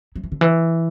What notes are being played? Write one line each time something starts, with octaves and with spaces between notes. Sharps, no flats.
F#3
E3
D3
E3